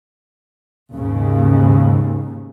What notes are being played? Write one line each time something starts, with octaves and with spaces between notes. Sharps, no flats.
D#2 G#2 C#3